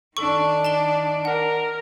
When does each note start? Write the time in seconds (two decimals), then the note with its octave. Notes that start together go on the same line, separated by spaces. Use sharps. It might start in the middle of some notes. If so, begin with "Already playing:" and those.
0.17 D#3 D4 A4 C#6
0.65 A5 E7 G7
1.25 A#4 F#5